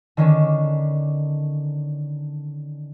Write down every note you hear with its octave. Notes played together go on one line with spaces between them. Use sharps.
D3 D#3 C#4 D4